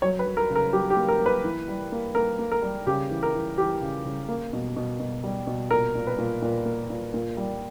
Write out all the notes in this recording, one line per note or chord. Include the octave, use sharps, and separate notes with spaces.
F#3 C#5
B4
F#3
A#4
C#3
A#4
F#3 G4
G4
A#3
A#4
A#3
B4
E3
G3
A#3
A#3 A#4
A#3
A#4
G3
C#3 G4
E3
A#4
E3
E3 G4
C#3
C#3
A#3
B2
B2
B2
G3
B2
A#2 A#4
A#2
B4
A#2
A#2
A#3
A#2
A#2
G3